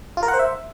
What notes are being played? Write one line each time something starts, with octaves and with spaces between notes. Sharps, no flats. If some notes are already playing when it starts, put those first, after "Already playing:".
F4
A#4
F#5
C5
E5